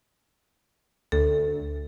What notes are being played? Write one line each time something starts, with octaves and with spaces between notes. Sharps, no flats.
D2 A4